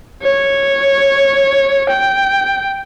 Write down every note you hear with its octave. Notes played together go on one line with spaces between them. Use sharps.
C#5
G5